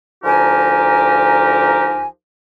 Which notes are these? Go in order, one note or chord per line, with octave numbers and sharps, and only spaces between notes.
D2 F3 D#4 G4 A#4 G#5